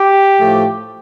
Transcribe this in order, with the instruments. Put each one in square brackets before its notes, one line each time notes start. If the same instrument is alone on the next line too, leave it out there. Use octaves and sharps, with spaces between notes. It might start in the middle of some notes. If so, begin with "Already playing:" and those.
Already playing: [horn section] G4
A2 F3 A3